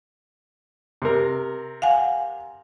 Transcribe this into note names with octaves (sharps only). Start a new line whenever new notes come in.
C3 A#4
F5 F#5 G#5